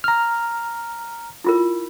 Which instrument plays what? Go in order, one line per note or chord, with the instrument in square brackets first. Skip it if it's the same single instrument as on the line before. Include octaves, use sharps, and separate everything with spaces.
[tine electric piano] A#5 F6
[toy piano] E4 F4 A#4